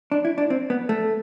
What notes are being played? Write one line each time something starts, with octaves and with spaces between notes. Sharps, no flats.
D4
E4
D4
C4
B3
A3